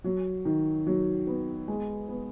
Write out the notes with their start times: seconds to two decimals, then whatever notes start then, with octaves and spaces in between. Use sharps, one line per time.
0.04 F#3
0.45 D#3
0.87 F#3
1.27 B3
1.68 G#3
2.09 B3